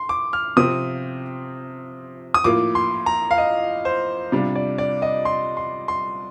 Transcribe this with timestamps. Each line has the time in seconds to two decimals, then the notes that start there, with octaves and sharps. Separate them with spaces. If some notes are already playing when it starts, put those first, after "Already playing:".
Already playing: C6
0.09 D6
0.33 F6
0.56 C3 F3 C4 D#6
2.34 D#6
2.44 A2 F3 A#3 F4 D6
2.75 C6
3.06 A#5
3.31 F5
3.38 D#5
3.85 C5
4.32 C3 G3 D4 F4
4.55 D5
4.78 D5
5.02 D#5
5.25 C6
5.57 C6
5.88 C6